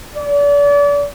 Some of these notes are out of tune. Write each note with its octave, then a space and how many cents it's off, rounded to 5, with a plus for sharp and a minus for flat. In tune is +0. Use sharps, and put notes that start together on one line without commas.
D5 -35